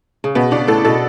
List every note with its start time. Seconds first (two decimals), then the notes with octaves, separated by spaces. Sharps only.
0.24 C#3
0.35 B2 B3
0.51 C#3 D4
0.68 A2 A4
0.85 B2 A4